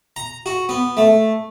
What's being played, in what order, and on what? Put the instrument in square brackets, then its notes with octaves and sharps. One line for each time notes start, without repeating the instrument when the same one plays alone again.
[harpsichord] A#5
F#4
B3
A3